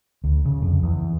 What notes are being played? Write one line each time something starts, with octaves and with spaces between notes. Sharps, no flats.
D2
C#3
F2
E2